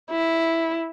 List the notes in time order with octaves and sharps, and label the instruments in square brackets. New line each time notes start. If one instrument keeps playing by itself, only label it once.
[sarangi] E4